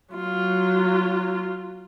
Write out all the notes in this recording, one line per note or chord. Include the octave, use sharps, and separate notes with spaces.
F#3 F4